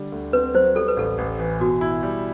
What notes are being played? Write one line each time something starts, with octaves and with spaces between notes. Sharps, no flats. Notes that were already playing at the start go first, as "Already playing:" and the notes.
Already playing: D3 G3
D2
C4 B4
F#3 C5
G3 A4
B4
A1 A4
A1
E3
B2 F#4
E4
G3